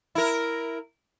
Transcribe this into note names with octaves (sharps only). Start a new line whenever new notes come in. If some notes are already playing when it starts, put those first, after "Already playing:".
E4 A#4